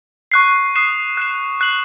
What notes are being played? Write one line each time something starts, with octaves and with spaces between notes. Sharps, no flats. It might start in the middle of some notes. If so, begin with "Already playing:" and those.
C#6 F#6 C7
D#6 F#6 C7 E7
F#6 C7 E7
F#6 C7 F#7